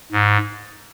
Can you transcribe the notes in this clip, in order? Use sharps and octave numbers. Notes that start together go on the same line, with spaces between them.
G#2